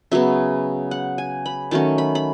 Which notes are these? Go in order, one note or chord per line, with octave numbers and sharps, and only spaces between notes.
C#3 F#3 B3 E5
F#5
G#5
B5
D#3 F#3 A3 C#4 A5
B5
B5